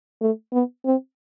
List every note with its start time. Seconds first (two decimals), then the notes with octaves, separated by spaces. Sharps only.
0.21 A3
0.52 B3
0.85 C4